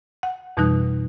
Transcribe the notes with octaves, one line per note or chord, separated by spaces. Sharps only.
F#5
F2 B2 E3 G3 D#4 F#6